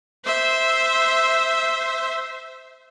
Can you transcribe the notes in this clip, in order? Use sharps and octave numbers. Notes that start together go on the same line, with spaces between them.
C5 E5